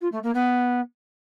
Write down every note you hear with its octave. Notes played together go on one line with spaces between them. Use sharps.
F4
A3
A#3
B3